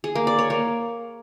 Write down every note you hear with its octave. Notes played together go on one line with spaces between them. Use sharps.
G#4
A#3
D5
C#5
A#3